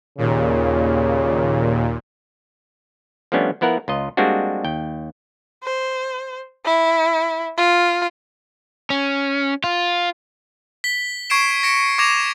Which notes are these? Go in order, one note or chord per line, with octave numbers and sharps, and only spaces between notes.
D#2 A#2 C#3
F3 G3 A3 B3 C#4 D4
F3 B3 E4 A#4 F#5
C#2 F4 D#5
G3 G#3 A#3 C4 D4 F#4
D#2 G5
C5
E4
F4
C#4
F4
B6 G7
C#6 G#6 C7 D7 E7
A#6 B6 C#7 D7 E7
C#6 D6 G#6 A#6 E7 F7